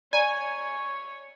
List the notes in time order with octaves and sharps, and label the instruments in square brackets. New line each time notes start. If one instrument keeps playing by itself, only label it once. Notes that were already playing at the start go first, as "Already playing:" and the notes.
[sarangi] C#5 [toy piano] D5 A#5 [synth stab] G#5